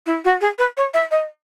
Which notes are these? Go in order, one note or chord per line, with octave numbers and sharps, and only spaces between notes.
E4
F#4
G#4
B4
C#5
E5
D#5